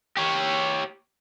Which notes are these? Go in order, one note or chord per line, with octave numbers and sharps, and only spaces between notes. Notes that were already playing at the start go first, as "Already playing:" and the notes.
G4 C#5